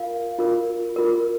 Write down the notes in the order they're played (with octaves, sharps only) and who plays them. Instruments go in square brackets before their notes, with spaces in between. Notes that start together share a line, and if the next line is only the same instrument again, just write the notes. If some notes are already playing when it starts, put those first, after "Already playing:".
Already playing: [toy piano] F4 A#4 F5
F4 A#4
F4 A#4